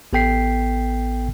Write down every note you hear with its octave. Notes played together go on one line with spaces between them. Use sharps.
A1 B3 A4 G5 B6 C7